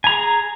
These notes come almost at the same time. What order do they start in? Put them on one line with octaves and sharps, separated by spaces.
G#5 A#5 G#4